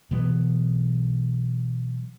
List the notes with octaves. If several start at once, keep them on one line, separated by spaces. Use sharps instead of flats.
B2 E3 F#3 B3